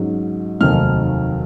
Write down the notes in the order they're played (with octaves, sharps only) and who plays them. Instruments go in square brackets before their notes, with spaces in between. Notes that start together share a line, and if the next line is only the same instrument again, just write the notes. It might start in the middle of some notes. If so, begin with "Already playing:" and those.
Already playing: [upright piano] G#2 F#3 C#4
F1 D#2 D#3 F#3 F6